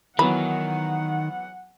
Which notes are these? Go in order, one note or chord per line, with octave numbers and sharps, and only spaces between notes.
D#3 E3 F#3 B3 F#5 B5